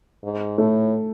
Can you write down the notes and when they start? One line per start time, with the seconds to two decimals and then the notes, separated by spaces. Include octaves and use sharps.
0.23 G#2
0.58 A2 A3